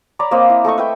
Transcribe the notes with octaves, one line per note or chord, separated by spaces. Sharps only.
C#5 D5 A#5 B5
A#3 C4 D#5
E4
A3 A4 D#5 C#6
B4 E5 G5